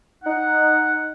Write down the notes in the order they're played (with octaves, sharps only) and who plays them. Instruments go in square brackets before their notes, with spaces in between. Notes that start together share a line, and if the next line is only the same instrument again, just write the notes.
[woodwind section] D#4 F#5